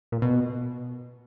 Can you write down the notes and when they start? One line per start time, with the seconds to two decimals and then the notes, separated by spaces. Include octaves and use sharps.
0.12 A#2
0.22 B2